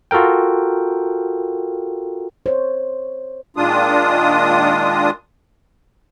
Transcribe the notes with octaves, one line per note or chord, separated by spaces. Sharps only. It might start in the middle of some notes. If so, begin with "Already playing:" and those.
F4 F#4 A4 A#4 G5
C5 C#5
A#2 D#3 G#3 D4 F4 D#6